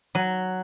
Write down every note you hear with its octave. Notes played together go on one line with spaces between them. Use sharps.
F#3